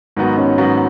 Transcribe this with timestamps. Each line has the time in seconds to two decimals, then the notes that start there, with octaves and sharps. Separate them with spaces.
0.17 G#2 D#3 F#3 B3 F#4
0.37 C#4
0.58 G#2 D#3 F#3 B3 F#4